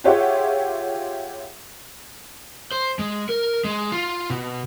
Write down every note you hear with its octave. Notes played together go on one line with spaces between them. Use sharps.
F4 G4 G#4 C#5 E5 F#5
C5
G#3
A#4
G#3
F4
B2